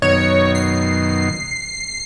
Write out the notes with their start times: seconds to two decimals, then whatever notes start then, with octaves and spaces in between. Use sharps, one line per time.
0.02 F#2 B2 D#3 C#5
0.55 C7